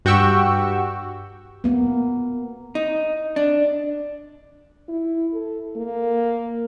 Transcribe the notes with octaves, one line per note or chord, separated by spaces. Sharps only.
G2 F#4 G4 G5 C#6 E6
A#3 B3
D#4
D4
E4
A4
A#3